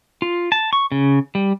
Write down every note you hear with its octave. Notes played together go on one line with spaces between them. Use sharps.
F4
A5
C#6
C#3
G3